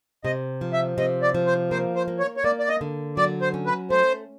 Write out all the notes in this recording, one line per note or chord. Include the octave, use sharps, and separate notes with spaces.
C3 D#5
F3
E5
C3 D#5
D5
F3
C5
A#3 C5
C5
A#3
C#5
C#5
A#3 D5
D5
D#5
D3
F#3 D5
C5
C#4
B4
A3 C5